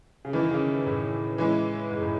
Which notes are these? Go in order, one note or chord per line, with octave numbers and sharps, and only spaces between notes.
C#3
D#3 E3 A3 E4
C#3
A2
E3 G#3 C#4 E4
G#2
A2